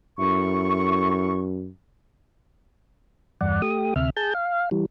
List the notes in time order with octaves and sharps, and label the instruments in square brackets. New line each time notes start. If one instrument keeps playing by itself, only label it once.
[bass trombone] F#2 [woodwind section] E4 A4 C#6
[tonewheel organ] E2 G2 D5 F#5
A3 G4 D#6
D2 C3 E5 F6
G#4 A5 G6
F5
E3 G3